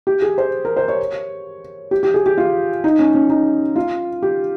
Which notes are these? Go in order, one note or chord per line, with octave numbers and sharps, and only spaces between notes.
G4
G#4
C5
A#4
C5
C#5
G4
G4
G#4
G4
F4
D#4
C#4
C#4
D#4
F4
G4